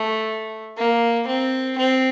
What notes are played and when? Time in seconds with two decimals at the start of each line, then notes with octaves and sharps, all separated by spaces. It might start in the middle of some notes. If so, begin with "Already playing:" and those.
Already playing: A3
0.78 A#3
1.28 C4
1.78 C4